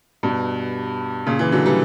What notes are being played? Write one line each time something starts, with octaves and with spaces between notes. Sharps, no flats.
G2 B2
A#2 C#3
C#3 E3
D3 F#3
E3 G3